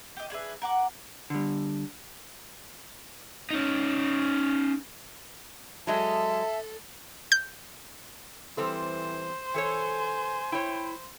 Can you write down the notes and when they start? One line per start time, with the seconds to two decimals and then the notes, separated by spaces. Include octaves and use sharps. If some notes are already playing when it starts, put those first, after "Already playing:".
0.17 G4 D#5
0.30 D4 G#4 B4 E5
0.62 A#4 F#5 D6
1.30 D3 G3
3.51 C#4 D#4
5.87 F#3 G#3 A4 D#5 E5 A5
7.32 G6
8.57 E3 G3 C4 A4 C5
9.54 E3 A4 C#5 G#5
10.52 E4 C#5 G5